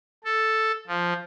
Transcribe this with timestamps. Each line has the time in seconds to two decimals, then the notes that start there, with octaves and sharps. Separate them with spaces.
0.25 A4
0.87 F3